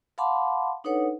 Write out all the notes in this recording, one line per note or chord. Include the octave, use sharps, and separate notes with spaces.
F5 F#5 A5 B5 C6 D6
D4 D#4 A4 B4 C#5 F#5